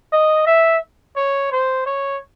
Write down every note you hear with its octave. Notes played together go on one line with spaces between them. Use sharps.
D#5
E5
C#5
C5
C#5